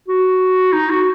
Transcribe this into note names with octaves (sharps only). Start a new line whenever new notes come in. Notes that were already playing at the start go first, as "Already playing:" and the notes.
F#4
D#4
F#4